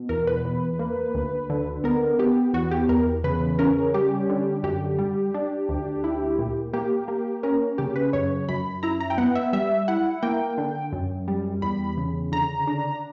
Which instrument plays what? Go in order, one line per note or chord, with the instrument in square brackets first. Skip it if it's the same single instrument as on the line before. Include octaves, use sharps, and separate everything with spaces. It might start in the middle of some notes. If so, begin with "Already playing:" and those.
Already playing: [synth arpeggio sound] B2
E2 A#4
B4
E2
A#3
D2
D3
B3 A#4
B3 G4
E2 F#4
G4
E2 A#4
C#3 B4
C#4 A#4
G3 G4
D3
F#2 G4
G3
D4
D2
E4
A#2
A#3 G4
A#3
C#4 A#4
C#3 G4
B4
F#2 C#5
F#2 B5
E4 A#5
A#5
G5
B3 F#5
E5
G3 E5
E4 F#5
A#3 G5
D3
F#2
G3
E2 B5
C#3
D3 A#5
D4